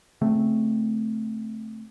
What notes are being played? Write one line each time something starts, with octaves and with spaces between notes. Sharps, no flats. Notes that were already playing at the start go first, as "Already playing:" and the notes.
C#3 A3 C4